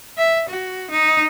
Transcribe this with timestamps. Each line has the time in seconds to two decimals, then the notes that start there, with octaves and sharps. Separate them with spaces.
0.17 E5
0.49 F#4
0.90 D#4